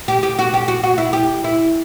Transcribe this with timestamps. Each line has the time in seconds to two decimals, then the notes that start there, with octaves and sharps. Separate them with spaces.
0.08 G4
0.23 G4
0.39 F#4
0.54 G4
0.68 F#4
0.84 F#4
0.98 E4
1.13 G4
1.44 E4